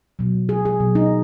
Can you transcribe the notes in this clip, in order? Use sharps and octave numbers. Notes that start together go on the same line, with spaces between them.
B2 F#3
G#4
G#4
B2 F#3
D#4